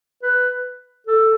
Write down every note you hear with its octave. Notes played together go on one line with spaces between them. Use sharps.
B4
A4